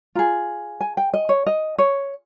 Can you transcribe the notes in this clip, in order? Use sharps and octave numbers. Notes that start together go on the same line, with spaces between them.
F4 G#4 A#5
G#5
G5
D#5
C#5
D#5
C#5